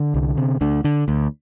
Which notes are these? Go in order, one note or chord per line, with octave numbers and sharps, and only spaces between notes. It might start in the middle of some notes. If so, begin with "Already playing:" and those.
Already playing: D3
C2
C3
D2 D3
D3
D2